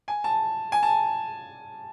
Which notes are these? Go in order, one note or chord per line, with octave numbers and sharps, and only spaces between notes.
G#5
A5
G#5
A5